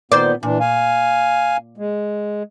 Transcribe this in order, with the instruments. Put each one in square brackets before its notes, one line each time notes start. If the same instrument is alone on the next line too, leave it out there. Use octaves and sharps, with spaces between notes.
[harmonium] A#2 B3 [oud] D#3 C5 D5
[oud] A#2 [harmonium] E3 D4
[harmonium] F5 G#5
G#3